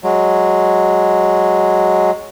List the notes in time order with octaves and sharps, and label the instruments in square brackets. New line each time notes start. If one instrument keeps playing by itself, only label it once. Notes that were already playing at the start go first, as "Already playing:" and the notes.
[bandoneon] F#3 G#3